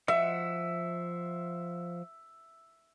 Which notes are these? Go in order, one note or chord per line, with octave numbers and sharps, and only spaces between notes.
F3 E5 F#5 E6